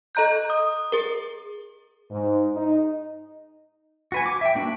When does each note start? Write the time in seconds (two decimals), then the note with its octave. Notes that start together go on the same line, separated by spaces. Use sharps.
0.15 A4 D#5 A#5 F#6 G6
0.50 D#6
0.92 G#4 A#4
2.11 G#2
2.56 D#4
4.12 F#4 B4 G#5
4.26 D6
4.41 E5 G5
4.55 A#3 D4 F#4 B4